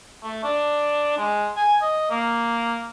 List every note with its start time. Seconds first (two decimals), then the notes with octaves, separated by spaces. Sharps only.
0.23 A3
0.44 D4
1.18 G#3
1.56 G#5
1.82 D#5
2.10 A#3